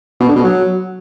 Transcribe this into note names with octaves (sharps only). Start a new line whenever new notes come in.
B2
D3
B2
F#3